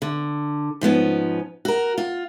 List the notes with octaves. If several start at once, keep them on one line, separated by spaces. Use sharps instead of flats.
D3
G#2 F3 B3 C#4
F#4 A#4
F4